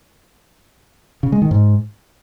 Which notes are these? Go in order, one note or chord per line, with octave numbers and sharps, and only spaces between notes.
C#3
G#3
D#3
G#2